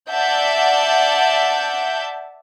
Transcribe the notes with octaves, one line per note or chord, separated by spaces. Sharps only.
D5 E5 F#5 A5 G6